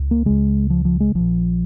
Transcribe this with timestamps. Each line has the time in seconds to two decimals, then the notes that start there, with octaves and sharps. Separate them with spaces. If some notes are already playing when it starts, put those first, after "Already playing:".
Already playing: C#2
0.11 A#3
0.25 C#2 C#3 G#3
0.70 F3
0.85 F3
1.00 G#3
1.15 A#1 A#2 F3